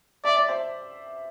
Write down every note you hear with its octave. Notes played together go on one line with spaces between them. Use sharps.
D5 E5
D5
C5 E5